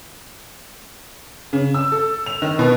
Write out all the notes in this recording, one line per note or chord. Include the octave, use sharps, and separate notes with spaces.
C#3
E6
A4
F7
D#3
B2